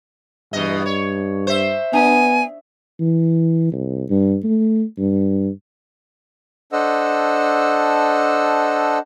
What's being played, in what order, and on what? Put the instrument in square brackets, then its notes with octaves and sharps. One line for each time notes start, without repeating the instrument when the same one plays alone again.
[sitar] E2 B2 D#5 [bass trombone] G2
[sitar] C#5
C5 E5
[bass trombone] B3 [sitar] D4 [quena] G#5
[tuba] E3
C2
G2
A3
G2
[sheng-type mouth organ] D4 A4 C5 D#5 F#5 E6